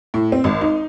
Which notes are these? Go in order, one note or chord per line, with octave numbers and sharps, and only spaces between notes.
A2
C4
G#1
D#4